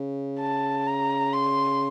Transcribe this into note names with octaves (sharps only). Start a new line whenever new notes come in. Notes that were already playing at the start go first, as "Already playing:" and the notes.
Already playing: C#3
A5
A#5
C6